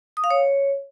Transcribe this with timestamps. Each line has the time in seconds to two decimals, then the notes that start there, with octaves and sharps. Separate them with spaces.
0.17 D#6
0.24 F5
0.31 C#5